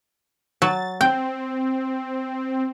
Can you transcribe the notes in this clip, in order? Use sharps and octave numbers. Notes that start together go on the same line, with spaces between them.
F#3 A6
C4 G5